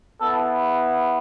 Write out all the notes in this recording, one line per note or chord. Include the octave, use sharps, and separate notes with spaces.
B3 E4 A4